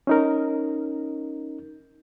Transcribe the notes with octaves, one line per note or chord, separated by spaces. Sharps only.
C#4 D#4 A#4